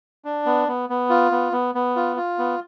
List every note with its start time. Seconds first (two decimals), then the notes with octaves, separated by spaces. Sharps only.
0.25 D4
0.46 B3
0.68 B3
0.89 B3
1.10 F4
1.31 B3
1.52 B3
1.75 B3
1.96 F4
2.16 F4
2.38 B3